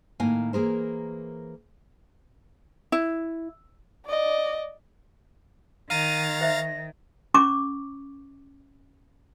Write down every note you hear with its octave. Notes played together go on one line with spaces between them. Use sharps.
A2 D#3 A#3 F5 G#5
E3 A#3 G#4 A#4 C5
E4
D5 D#5
D#3 F5 A#5 A6 D#7
C5 E5 A#6
C#4 C#6 D6